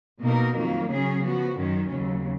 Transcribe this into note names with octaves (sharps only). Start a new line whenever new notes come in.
B2 A#3 D#4 A#4
F2 D#3 F#3 A#3
C#3 F#3 C#4 G#4
F3 B3 F#4
F#2 D#3 F#3 C#4
D#2 C#3 F#3